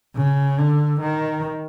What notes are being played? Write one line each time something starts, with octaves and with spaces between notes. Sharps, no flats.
C#3
D3
D#3